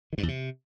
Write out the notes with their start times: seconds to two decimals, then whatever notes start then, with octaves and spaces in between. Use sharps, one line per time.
0.13 D#3
0.18 G2
0.23 E2
0.28 C3